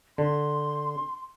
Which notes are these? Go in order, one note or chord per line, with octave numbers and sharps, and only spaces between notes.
D3 C6